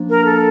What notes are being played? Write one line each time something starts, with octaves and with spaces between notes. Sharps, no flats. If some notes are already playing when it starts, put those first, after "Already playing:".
Already playing: F3 A#3 D4
A#4
A4